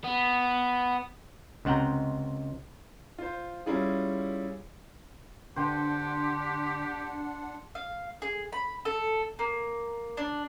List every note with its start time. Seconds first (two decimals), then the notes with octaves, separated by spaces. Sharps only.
0.04 B3
1.65 C#2 C3 F#5 G5 A#5
3.18 F4 C5
3.66 G3 C#4 E4 F4 G#4
5.56 D3 D4 G4 C5 F#5 G5
7.75 F5
8.22 G#4
8.52 B5
8.85 A4
9.39 A#3
10.17 D4